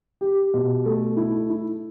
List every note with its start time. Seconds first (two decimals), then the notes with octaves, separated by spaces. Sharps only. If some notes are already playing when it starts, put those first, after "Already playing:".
0.21 G4
0.54 B2
0.85 A3
1.17 E4
1.50 E4